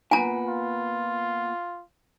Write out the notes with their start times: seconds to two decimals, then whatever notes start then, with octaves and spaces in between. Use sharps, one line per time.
0.11 A#2 B3 G#5 A#5
0.48 F4